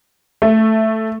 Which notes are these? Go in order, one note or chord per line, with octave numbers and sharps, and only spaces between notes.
A3